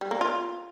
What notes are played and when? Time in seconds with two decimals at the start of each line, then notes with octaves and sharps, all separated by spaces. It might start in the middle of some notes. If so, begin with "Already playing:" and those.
0.01 G3
0.11 A#3
0.21 F4